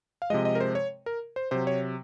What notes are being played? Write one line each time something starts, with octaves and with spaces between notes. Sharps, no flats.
F5
C3 F3 G#3 D#5
D#5
A#4
C5
C#5
A#4
C5
C3 F#3 C5
C#5